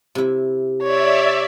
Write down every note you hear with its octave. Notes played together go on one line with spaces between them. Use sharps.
C3 E4
C#5 D5 E5